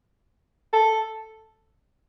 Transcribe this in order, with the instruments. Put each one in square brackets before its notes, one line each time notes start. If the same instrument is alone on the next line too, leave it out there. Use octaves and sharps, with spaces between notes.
[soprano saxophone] A4